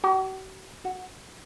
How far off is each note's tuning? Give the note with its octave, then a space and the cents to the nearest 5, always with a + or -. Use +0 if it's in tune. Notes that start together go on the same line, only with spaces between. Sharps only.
F#4 +45
F#4 -5